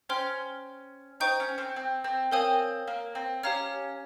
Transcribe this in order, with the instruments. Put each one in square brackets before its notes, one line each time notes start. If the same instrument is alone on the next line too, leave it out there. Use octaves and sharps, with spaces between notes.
[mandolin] C#4 [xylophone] C5 G5 C6 F6
[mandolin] D#4 [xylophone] C5 G5 C#6 G6
[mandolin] C#4
C4
C4
C4
[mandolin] C4 [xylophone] A#4 C#5 F5 G#5 D#6
[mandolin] A#3
C4
[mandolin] C#4 [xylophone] G4 C#5 F5 A#5 F6